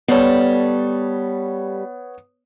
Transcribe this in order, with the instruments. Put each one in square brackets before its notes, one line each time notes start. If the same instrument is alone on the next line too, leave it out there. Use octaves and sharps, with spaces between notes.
[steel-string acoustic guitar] G3 A4 [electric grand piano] B3 C#5